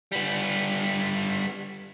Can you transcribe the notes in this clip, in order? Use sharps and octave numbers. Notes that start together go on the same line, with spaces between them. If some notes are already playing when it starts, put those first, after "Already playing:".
G3 B3